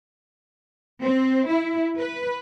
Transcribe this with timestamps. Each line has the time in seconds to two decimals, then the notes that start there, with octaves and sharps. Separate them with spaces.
1.02 C4
1.49 E4
1.97 B4